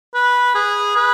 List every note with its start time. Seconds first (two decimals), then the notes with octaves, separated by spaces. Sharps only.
0.14 B4
0.55 G#4
0.96 B4